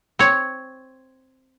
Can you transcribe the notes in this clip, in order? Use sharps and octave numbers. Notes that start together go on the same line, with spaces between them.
C4 C#5